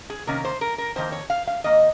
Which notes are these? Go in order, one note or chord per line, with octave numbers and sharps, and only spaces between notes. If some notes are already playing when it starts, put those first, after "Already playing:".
G#4
C3 D#3 A#3 C#4 A#4
C5
A#4
A#4
F2 D#3 A#3 C5
C#5
F5
F5
G#2 D#3 A#3 D#5